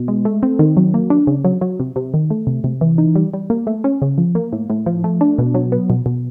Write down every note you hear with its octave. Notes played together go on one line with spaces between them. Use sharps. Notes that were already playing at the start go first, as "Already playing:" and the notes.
Already playing: B2
G#3
A3
C4
D#3
F#3
A#3
D4
C#3
F#3
F#3
C3
C3
D#3
A3
C3
C3
E3
D#4
G3
G3
A#3
A3
C#4
C#3
F3
A#3
A2
A2
F3
A3
D4
B2
F#3
B3
B2
B2